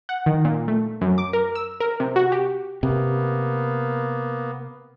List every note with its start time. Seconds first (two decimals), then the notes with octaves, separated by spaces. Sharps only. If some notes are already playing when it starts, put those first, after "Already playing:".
0.09 F#5
0.26 D#3
0.45 A#2
0.68 A3
1.01 F#2
1.18 D6
1.33 A#4
1.55 E6
1.80 A#4
2.00 C3
2.16 F#4
2.32 G4
2.83 C3 A#3 B3